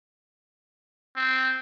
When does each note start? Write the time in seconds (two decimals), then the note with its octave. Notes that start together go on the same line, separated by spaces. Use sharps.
1.16 C4